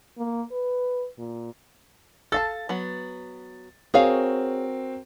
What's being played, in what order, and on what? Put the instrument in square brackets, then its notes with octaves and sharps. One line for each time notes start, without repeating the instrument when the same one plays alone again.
[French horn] A#3
B4
A#2
[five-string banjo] A4 F5 A5 [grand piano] A6
[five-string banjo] F#3 B3
[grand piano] C4 F#4 A#4 [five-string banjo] G#4 C#5 F5